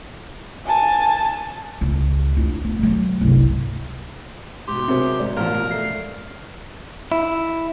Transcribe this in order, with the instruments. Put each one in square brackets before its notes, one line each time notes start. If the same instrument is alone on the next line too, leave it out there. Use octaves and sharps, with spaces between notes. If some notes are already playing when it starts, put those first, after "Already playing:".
[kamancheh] G#5 A5
[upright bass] C#2
D4 F4
B3
D3 F#3
G1 C2
[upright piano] G#2 B2 [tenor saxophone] G4 [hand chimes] C6
[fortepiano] C3 [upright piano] F#3 G#4 [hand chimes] C4 A#4 C5
[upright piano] G#2 B2 [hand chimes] D5
[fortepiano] A1 F3 [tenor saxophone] A#4 [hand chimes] F5
[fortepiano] A3 [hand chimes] C7
[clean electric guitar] E4